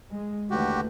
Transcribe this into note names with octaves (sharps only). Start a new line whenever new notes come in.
G#3
D#2 D3 E3 A3 F#4 G4